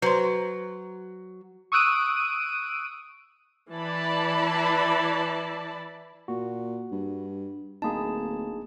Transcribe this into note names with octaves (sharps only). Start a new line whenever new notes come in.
F#3 B4 C5 C6
C#6 D#6 E6 F#6 D7 D#7
E3 D5 A5 B5
A#2 F#4
G2
D1 A#3 D#4 G#4 A5